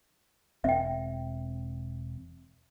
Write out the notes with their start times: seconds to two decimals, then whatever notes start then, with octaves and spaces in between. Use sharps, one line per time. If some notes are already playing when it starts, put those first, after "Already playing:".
0.64 E1 C4 E5 G5